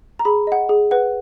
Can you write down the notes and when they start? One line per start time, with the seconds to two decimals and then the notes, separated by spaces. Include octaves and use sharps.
0.19 A#5
0.25 G#4 B5
0.47 D#5 F#5
0.69 G#4
0.91 B4 F#5